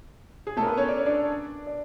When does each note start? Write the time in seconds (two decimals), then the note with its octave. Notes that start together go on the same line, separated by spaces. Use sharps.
0.47 G#4
0.57 A3 A4
0.62 A#4
0.67 B3 B4
0.77 C#4 C#5
0.88 D5
0.97 C#5
1.06 D4 D5
1.67 D5